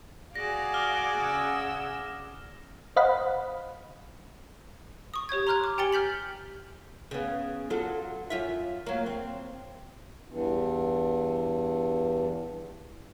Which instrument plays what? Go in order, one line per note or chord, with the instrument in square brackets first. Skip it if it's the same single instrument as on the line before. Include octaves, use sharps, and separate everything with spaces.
[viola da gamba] F#4 D5 [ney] G#4 [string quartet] F5 [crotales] A#6
[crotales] D6 F6 G7
[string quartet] C#3 F#5 E6
[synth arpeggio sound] C5 D#5 F5 F#5 B5
[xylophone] C#6 D#6
G4 C#5 G6 G#6
A#5 C6 F6 F#6 G#6
D6
G4 G5 G#5 A6 C#7 G7
F6 G6 B6 F#7
[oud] C#3 B3
F#3 F4 A4
F#2 F4 E5
F#3 A#3
C4
[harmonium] E2 G2